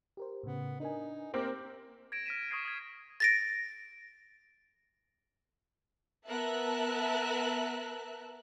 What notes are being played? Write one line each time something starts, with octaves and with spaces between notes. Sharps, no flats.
G4 A#4 C5
A2 C#3 B3
D4 D#4 A#4 G#5
A#3 C4 G4 A#4 G5
G#6 A#6 D7 E7
F6 A#6 B6 D#7 E7
C#6 D#6 F6 G#6 C7 D7
D#6 G#6
A6 A#6 D7
B3 A#4 E5 A5 E6 F#6